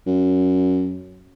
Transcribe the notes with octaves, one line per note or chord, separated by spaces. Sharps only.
F#2